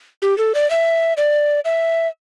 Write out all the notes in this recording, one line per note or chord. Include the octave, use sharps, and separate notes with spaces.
G4
A4
D5
E5
D5
E5